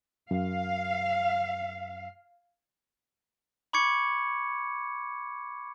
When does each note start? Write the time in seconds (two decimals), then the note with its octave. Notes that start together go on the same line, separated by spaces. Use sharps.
0.31 F#2 F5
3.73 B5 C#6 D6 G#6 C#7